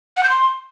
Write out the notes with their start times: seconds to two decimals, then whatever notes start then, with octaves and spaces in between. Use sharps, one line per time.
0.17 F#5
0.23 G6
0.30 C6